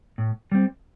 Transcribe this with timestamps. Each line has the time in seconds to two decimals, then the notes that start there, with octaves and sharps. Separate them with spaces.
0.18 A2
0.52 G3 C4